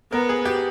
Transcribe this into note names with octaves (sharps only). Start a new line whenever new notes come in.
B3 A#4
G#4
G4